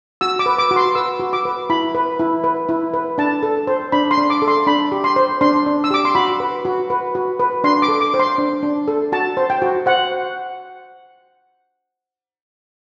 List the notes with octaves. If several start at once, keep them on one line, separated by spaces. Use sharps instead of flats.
F#4 E6
D6
B4
D6
F#4
C6
B4 E6
F#4
D6
B4
E4 B5
B4
E4
B4
E4
B4
D4 A5
A4
C5
D4 B5
C6
D4
D6
A4
C6
D4 B5
G4
C6
C5
D4 C6
D4
E6
G4 D6
C6
F#4 B5
B4
F#4
B4
F#4
B4
D4 C6
D6
A4
D6
C5
C6
D4
D4
A4
F#4 A5
C5
G5
F#4
C5 F#5